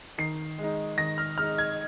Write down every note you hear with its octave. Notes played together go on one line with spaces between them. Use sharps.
D#3 C7
G#3 D#4
D#3 A#6
F6
G#3 D#4 F6
G#6